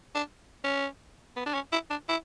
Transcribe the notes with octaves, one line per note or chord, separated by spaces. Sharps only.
D4
C#4
B3
D4
C#4
E4
D4
E4